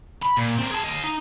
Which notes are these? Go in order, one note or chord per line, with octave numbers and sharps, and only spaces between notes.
B5
A#2
C4 A#4
G#4 A5
D#5 F5
D#4